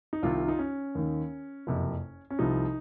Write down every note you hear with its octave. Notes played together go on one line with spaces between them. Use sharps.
D#4
C2 C3 D#3 F4
D#4
C#4
D#2 D#3
F#1 F2 C3
C#4
C2 C3 F3 D#4